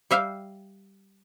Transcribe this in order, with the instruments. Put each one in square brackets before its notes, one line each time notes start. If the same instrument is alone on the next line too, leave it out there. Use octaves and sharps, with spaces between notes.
[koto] G3 E5 F5 G5